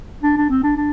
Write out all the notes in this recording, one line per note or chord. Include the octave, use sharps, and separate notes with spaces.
D4
D4
C4
D4
D4